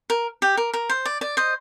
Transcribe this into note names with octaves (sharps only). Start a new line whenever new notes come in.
A#4
G4
A#4
A#4
C5
D5
D5
C5 D#5